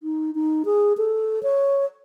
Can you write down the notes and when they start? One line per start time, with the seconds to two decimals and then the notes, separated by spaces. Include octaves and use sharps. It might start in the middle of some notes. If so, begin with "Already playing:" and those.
0.03 D#4
0.35 D#4
0.65 G#4
0.98 A4
1.43 C#5